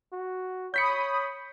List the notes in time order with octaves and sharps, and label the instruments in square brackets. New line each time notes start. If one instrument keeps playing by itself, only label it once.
[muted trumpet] F#4
[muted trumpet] C#5 [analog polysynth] B5 D#6 [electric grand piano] G6 B6 C#7